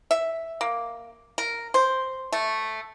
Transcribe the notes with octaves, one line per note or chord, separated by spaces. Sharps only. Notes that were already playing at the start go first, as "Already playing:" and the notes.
E5
A#3
A#4
C5
A3